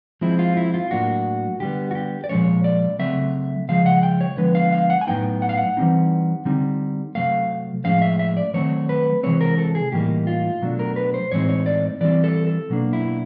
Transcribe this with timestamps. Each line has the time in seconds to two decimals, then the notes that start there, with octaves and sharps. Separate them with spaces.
0.21 F3 G#3 C4 E4
0.39 F4
0.57 E4
0.74 F4
0.91 A2 F#3 A#3 D4 F#4
1.60 D3 G3 B3 G4
1.91 F#4
1.95 G4
2.24 D5
2.29 A#2 F3 G#3 C#4 C#5
2.64 D5
2.99 C#3 F#3 A3 C4 E5
3.69 C#3 F3 G#3 F5
3.86 F#5
4.03 G5
4.21 C#5
4.37 D3 F3 G#3 B3 B4
4.55 F5
4.72 F5
4.90 F#5
5.01 G#5
5.07 A2 F#3 B3 D#4 G5
5.42 F#5
5.49 F5
5.57 F#5
5.77 E3 G3 C4 D#4
6.45 D3 G3 C4 D#4
7.15 C3 D#3 F#3 A3 F5
7.85 A2 F3 G#3 C#4 F5
8.02 E5
8.19 E5
8.37 D5
8.54 D#3 F#3 A3 C4 C#5
8.89 B4
9.23 C3 E3 G#3 C4 C#5
9.41 A#4
9.58 A4
9.75 G#4
9.92 A2 E3 G3 A#3 D#4 G4
10.27 F4
10.62 B2 F#3 A3 D4
10.79 A#4
10.96 B4
11.14 C5
11.32 A2 E3 G#3 C4 D#4 C#5
11.49 C#5
11.66 D5
12.01 E3 G3 C4 D5
12.24 A4
12.47 A4
12.70 B2 F#3 A#3 D4
12.93 E4